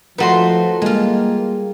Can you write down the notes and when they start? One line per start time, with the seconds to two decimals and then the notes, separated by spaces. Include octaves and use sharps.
0.18 F3 A3 D#4 F#4 B4 C6
0.82 G3 G#3 A#3 F4